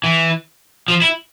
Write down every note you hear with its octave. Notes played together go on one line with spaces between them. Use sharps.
E3
F3
E4